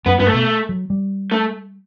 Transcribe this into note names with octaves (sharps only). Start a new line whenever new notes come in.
F#2 B3
G2 B3
A3
B2
F#3
G3
A3